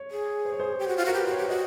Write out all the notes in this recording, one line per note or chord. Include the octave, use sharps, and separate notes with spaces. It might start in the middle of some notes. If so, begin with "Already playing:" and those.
Already playing: C#5
G#4
C5
C#5
C5
G4
F#4
F4
F#4 A#4
G4 B4
F#4 C5
C#5
G4
F#4 D#5